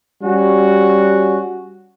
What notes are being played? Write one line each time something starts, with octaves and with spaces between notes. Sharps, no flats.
G3 C#4 F#4